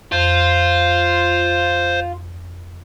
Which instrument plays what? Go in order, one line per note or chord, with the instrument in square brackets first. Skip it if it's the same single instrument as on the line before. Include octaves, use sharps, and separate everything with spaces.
[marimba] F2 [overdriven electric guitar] F4 [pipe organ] C5